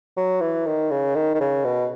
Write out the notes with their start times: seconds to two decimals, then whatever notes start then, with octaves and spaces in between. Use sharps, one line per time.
0.17 F#3
0.41 E3
0.66 D#3
0.91 C#3
1.15 D#3
1.35 D#3
1.40 C#3
1.65 B2